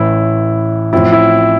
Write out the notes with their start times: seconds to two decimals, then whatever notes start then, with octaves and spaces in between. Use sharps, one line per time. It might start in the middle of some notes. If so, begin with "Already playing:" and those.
Already playing: A1 A2 E3 E4
0.93 A1 A2 F3 C4 E4
1.12 E4